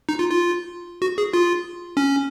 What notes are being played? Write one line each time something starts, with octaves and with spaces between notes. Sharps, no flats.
D#4
F4
F4
F#4
G#4
F4
C#4